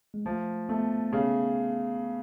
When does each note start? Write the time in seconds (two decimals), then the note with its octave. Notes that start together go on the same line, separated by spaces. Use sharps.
0.14 G#3
0.25 F3 A3
0.69 A3 B3
1.12 C#3 B3